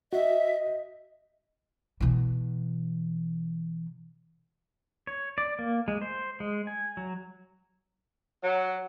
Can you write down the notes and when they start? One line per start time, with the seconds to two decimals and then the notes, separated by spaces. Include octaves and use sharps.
0.13 F#4 D#5 E5
2.00 B2 E3
5.07 C#5
5.38 D5
5.59 A#3
5.88 G#3
6.02 C5
6.40 G#3
6.67 G#5
6.97 F#3
8.43 F#3